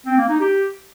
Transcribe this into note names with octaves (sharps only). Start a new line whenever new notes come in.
C4
A#3
D#4
G4